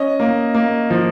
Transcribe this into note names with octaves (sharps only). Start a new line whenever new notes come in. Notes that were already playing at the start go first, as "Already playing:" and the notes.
Already playing: C#4 D#5
A#3
A#3
F3